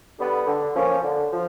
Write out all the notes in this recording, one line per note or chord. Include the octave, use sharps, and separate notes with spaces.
D3 G3 B3 D4
D3
F3 A#3 C#4
D3
F3